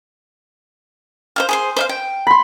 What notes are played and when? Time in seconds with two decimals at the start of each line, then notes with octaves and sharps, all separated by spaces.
1.36 C5 E5 F5
1.49 G#4 C5 C6
1.76 C5 E5 F5
1.89 G5
2.27 B5 C6